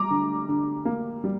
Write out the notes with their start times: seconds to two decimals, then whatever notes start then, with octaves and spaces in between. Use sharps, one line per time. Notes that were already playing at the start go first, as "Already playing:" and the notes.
Already playing: G3 A#5 D6
0.10 D3
0.49 D3
0.85 A#3
1.24 G3